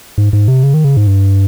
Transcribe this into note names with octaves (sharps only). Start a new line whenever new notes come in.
G#2
G#2
C3
C#3
D#3
C#3
G#2
G2